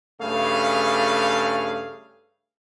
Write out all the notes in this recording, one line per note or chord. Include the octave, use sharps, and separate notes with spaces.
G2 C#3 A3 G#4 F5